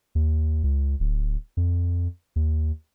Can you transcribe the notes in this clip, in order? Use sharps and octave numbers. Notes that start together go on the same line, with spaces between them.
D#2
C#2
D1
F2
D#2